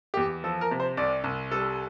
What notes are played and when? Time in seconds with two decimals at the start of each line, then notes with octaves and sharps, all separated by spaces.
0.14 E2 G4
0.44 F3 A4
0.61 A#4
0.71 C3
0.80 C5
0.97 C2 D5
1.24 C2
1.51 G3 A4